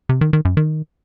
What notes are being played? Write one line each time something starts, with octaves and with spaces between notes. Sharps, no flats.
C3
D#3
D#3
F#2
D#3